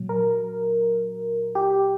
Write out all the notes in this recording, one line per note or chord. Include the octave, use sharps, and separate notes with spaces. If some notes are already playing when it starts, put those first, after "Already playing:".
Already playing: A#2 F#3
A#4
G4